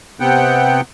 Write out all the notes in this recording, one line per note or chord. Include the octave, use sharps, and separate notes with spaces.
C3 B3 F#5 G5